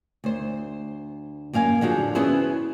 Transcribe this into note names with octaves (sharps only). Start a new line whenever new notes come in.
D2 C5
F#2 A#3 F5 G#5
D3 F3 F#4 G#4
B3 C#4 E4 G#4 B4 C5